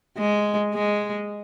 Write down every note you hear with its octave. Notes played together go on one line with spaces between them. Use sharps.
G#3
G#3